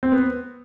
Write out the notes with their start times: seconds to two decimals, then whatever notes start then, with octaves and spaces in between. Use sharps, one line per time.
0.03 C4
0.12 B3